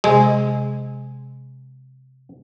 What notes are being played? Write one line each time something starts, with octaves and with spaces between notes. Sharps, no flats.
C3 G#3 G#4